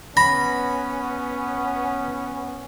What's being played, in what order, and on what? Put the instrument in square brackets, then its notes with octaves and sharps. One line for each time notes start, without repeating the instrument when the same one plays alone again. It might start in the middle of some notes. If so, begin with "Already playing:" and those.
[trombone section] B3 C#4 [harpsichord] B5 [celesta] A#6